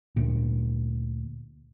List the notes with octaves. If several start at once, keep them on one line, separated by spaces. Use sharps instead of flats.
D2 A#2